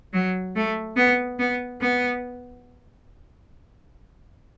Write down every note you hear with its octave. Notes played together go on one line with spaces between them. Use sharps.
F#3
A3
B3
B3
B3